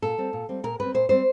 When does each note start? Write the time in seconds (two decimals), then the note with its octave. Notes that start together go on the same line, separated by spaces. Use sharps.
0.02 A#2 A4
0.18 G3 C4
0.33 A#2
0.49 G3 C4
0.63 A#2 A#4
0.80 G3 C4 B4
0.94 A#2 C5
1.09 G3 C4 C5